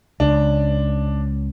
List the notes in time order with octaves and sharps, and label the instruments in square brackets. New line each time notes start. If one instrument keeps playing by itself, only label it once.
[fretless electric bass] C#2 [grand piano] D4